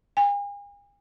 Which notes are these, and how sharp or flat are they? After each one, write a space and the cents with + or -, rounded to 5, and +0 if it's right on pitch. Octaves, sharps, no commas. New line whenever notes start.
G#5 -45